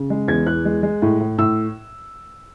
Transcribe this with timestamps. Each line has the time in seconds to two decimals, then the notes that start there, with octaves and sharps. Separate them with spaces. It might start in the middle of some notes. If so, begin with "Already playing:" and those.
Already playing: C#3
0.10 G#3
0.28 E2 G#6
0.46 E2 F#6
0.65 G#3
0.83 G#3
1.02 A2
1.20 A2
1.38 A2 E6